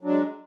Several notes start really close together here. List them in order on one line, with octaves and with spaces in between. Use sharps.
F#3 D4 G#3